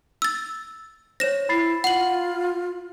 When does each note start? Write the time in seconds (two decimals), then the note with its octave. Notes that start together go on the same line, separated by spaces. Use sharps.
0.22 E6 A6
1.20 C5 C#5 A#6 E7
1.49 E4 B5 A6 C7
1.84 F4 F#5 F#7